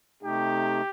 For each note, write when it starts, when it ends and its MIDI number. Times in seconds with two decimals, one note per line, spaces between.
0.23 0.81 48
0.23 0.81 57
0.23 0.81 63
0.23 0.90 67